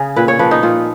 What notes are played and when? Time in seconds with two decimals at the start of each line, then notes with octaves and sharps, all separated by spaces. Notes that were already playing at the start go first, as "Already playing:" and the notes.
Already playing: C#3 G#4
0.16 A#2 B4
0.28 C#5
0.39 F3 B4
0.51 D#4
0.63 A#2 F4